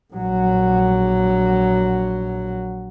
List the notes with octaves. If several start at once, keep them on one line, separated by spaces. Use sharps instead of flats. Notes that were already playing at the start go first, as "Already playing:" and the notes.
A#1 F#3